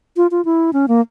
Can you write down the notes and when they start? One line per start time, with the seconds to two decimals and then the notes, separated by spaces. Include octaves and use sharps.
0.17 F4
0.31 F4
0.45 E4
0.73 C#4
0.88 A#3